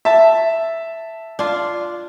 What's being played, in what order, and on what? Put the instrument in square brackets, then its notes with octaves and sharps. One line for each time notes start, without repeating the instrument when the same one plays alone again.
[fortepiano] E5 A5
[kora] D4 F4